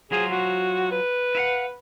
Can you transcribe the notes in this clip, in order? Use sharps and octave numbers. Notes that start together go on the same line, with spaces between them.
F#3 F4 G#4 C5
F#4
B4
E4 F5 F#5